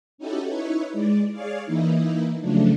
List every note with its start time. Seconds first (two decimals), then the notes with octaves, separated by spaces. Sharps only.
0.18 C#4 D#4 E4 F#4 G4 A4
0.47 D#4 E4 B4 C#5
0.93 G#3 D5
1.32 G#4 C#5 D5 F5
1.66 E3 A#3 D#4 E4
2.40 C#3 F3 F#3 A3 D4